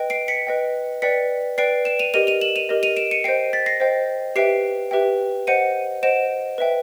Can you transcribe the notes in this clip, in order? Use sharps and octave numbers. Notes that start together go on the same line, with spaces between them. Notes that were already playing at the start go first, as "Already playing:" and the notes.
Already playing: B4 D#5 G5
C7 D7
B6 C#7
B4 D#5 G5
B4 D5 G5 B6 C#7
B4 D5 G5 C7 D7
D7 E7
D#7 F7
G4 A#4 D#5 D#7 F7
D#7 F7
E7 F#7
D#7 F7
G4 A#4 D#5
D#7 F7
D7 E7
C#7 D#7
C5 D#5 G5 C7 D7
A6 B6
A#6 C7
C5 D#5 G5
G4 B4 E5 G5 C7 D7
G4 B4 E5 G5
C5 D#5 F#5 C#7 D#7
C5 D#5 F#5 D7 E7
B4 E5 G5